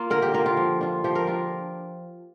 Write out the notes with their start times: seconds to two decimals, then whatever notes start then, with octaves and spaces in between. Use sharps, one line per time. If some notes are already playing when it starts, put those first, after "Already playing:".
Already playing: A#3 F4
0.10 D3 A#4
0.22 G4
0.34 A#3 F4 A#4
0.46 F4
0.57 F3
0.81 D4 F4
1.04 F3 G4
1.15 A#4
1.27 D4 F4